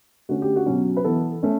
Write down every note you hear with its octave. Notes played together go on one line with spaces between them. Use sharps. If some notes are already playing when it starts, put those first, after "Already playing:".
D3 A3 C#4 F#4
G4
F#4
B2 F#3 C#4
B4
E3 B3 A4
A3 C#4